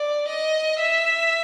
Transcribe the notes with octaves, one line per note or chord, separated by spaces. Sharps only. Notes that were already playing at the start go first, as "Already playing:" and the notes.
Already playing: D5
D#5
E5